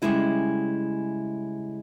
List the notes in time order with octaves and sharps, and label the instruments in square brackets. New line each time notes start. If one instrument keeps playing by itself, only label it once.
[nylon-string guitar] C#3 F3 G3 G#3 E4 D#5